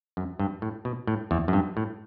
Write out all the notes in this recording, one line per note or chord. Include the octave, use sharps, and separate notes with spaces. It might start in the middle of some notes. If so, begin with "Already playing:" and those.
F#2
G2
A2
B2
A2
E2
F#2
G2
A2